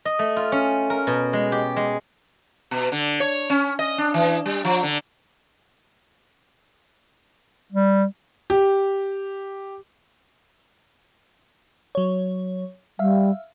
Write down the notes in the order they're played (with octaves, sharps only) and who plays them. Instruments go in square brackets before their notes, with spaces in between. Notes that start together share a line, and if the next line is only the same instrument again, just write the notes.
[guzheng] D#5
A3
F4
C#4
A#4
B2
G#3
G4
G#3
[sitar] B2
D3
C#5
C#4
D#5
D4
E3
G3
F3
D3
[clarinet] G3
[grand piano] G4
[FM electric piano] F#3 C#5
[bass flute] G3 [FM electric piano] E5 F5